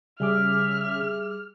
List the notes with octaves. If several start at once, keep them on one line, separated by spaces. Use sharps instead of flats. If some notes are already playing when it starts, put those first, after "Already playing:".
C#3 G3 G#4 E5 D6 F6